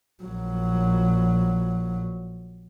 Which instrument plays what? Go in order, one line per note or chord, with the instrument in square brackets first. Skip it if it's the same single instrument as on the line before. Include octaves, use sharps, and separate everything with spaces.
[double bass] A#1 F#3